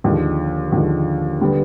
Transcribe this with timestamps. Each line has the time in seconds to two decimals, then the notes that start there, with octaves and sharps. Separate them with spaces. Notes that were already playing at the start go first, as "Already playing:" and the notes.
0.04 D#2 D3 F3 G#3
0.72 D#2 D3 F3 G#3
1.41 D3 G3 B3